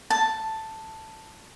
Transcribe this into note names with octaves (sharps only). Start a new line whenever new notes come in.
A5